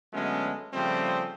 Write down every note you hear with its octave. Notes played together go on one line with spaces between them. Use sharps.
D3 F#3 G#3 A3 B3 C#4
C#3 F3 G3 A3 C4